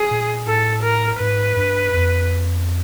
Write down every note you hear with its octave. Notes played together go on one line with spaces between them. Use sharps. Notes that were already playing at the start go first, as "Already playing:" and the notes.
Already playing: G#4
A#2
A2 A4
A#4
G#2 B4
G2
F2